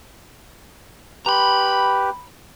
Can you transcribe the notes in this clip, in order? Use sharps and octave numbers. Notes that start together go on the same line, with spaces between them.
G4 B4 A#5 B5